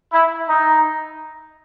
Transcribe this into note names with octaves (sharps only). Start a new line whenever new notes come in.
E4
D#4